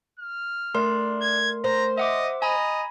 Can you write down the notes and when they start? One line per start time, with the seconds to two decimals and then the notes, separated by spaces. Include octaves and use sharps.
0.19 F6
0.74 A3 D4 A#4 C6
1.21 G#6
1.64 C5 A#5
1.98 D#5 E5 F#5 D6
2.42 D#5 G#5 A#5 B5